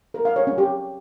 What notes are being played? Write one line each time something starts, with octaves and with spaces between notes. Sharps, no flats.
A#4
F5
C#5
C#4
G4